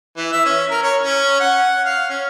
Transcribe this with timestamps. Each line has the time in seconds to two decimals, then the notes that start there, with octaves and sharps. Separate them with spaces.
0.17 E3
0.32 E5
0.45 C#4
0.70 A#4
0.83 C#5
1.01 C#4
1.39 F#5
1.85 F5
2.09 C#4